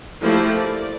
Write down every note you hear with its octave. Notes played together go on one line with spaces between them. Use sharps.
F3 A3 A#3 E4 G4
D5